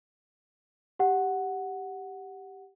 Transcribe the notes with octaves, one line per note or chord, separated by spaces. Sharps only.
G4 F#5